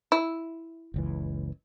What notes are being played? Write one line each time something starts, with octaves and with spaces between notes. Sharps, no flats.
E4
F#1 C#2 E3